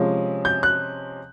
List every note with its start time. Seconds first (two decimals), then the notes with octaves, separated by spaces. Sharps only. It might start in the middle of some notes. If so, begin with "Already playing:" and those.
Already playing: C3 F3 G#3 C#4
0.45 G6
0.63 F#6